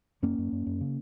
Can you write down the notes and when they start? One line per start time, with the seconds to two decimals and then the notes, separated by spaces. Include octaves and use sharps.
0.22 F#2 A#3 C#4
0.38 F#2
0.52 F#2
0.67 F#2
0.81 C#3